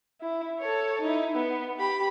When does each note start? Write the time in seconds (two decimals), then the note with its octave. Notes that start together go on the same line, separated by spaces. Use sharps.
0.21 E4
0.59 A4 C#5
1.01 D#4 E4
1.36 B3
1.78 G4 B5